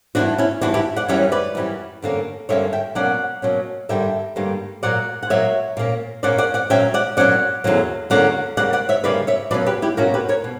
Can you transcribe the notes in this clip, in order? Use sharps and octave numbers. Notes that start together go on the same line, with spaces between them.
G2 E3 B3 D4 F#4
C#4 E4
G2 E3 B3 D4 F#4
E4 G4
D5 F#5
F#2 E3 G3 C#4 C#5 E5
B4 D5
F#2 E3 G3 C#4
G2 D3 A#3 C#4
G2 D3 A#3 C#4 C#5 E5
E5 G5
B2 F#3 A#3 C#4 D5 F#5
B2 F#3 A#3 C#4
G2 D3 G3 A#3 E5 G5
G2 D3 G3 A#3
A#2 F#3 A#3 D5 F#5
F#5
A#2 F#3 A#3 C#5 E5
A#2 A#3 C#4
A#2 A#3 C#4 D5 F#5
D5 F#5
D5 F#5
A#2 F#3 C#4 E5 G5
D5 F#5
A#2 F#3 C#4 D5 F#5
E2 D3 F#3 A#3 C#4
E2 D3 F#3 A#3 C#4 D5 F#5
C#3 G3 A#3 D5 F#5
D5 F#5
C#5 E5
C#3 G3 A#3 B4 D5
C#5 E5
B2 F#3 A#3 C#4 B4 D5
G4 B4
E4 G4
B2 F#3 A#3 C#4 F#4 A#4
G4 B4
A#4 C#5
B2